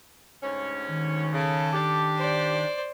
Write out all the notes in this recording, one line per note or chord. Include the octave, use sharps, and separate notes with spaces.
D2 G#2 C#4
D#3
C#3 A4
D4 G4
C5 D5